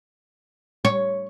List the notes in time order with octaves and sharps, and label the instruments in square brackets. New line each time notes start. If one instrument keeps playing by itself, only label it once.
[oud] C#5